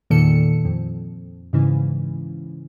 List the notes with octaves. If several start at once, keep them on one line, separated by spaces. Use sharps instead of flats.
E2 A#2 D#3 A4 C#7
F2
G#2 C#3 E3